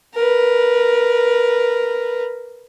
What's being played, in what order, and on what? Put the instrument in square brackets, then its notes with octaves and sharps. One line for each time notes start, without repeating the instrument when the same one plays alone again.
[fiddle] A#4 B4